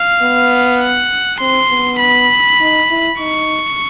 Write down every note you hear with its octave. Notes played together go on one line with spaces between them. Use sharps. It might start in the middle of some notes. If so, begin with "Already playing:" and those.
Already playing: F5
B3
F#5
C4 C6
B3
B5
D#4
E4
D#4 C#6